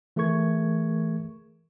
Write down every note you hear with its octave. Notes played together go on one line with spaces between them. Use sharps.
E3 A3 G#4 A#4 C#6 G#6